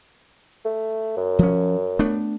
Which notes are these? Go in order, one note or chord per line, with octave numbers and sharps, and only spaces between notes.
A3
F#2
F3 C#4
A3 B3 D4